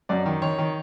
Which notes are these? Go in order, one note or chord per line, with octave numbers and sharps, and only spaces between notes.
F#2 D5
D#3
D#3 C#5
D#3